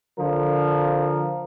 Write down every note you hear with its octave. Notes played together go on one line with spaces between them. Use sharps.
D3 F3 A#4